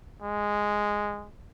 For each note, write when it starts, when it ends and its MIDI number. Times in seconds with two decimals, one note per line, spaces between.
0.22 1.28 56